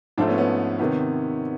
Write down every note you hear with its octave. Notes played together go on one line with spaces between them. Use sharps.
G#2 F3 A3 C4 D4
B3 C#4
B3 C#4
C3 D#3 B3 C#4